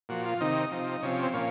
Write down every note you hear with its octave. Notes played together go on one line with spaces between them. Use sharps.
A#2 F3 F#4
F4
C3 D#3 D#4
C3 F3
C3 F3 C#4
C4
A#2 F3 C#4